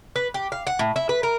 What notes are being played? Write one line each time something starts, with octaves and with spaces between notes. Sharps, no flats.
B4
G4
F5
F#5
A2
E4
B4
A#4